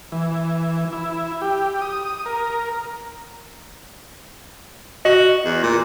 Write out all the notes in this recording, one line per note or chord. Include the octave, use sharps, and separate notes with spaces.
E3
E4
G4
D#6
A#4
F#4 D#5
E2
A#2